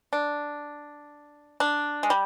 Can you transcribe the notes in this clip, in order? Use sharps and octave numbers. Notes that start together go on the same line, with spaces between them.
D4
D4
G#3
G3